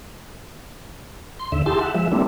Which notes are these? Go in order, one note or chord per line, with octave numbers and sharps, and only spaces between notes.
C6
D#2 D3 E5
E4 G4 G#4 A5 C6
E5 F#5
F3 G#3 E5
G3 A3 A#3 C4 D4 E4